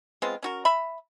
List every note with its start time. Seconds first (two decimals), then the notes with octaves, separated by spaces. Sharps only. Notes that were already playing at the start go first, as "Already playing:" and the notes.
0.22 G#3 B3 C4 F4
0.43 C#4 F#4 A#4
0.65 E5 B5